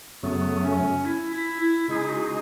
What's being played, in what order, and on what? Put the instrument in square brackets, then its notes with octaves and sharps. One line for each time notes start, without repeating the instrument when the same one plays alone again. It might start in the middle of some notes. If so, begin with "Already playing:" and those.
[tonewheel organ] F#2 C#3 F#3 A3 [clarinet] B3
[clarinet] C#4
E4
E4
E4
[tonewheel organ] C#3 G#3 D#4 G#4 [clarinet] E4
[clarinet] F#4